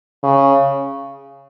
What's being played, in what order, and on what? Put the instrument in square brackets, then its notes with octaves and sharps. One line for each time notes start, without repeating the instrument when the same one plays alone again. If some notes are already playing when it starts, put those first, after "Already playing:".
[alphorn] C#3